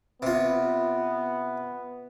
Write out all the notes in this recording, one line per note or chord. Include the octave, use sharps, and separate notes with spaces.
C3 B3 F4